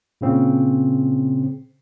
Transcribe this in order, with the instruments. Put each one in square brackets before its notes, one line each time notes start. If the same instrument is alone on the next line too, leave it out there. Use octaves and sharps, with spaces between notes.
[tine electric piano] A#2 C#3 C4